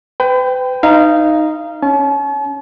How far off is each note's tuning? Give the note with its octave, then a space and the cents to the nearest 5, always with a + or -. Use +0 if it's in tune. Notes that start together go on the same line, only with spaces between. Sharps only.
B4 +40 G5 +0
D#4 +0 F5 -25
C#4 +0 A5 -45